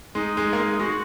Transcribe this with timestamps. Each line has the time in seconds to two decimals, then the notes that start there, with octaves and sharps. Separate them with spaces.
0.15 G#3 D#4
0.37 G#3
0.53 A#3
0.58 G#3
0.80 G#3 F#4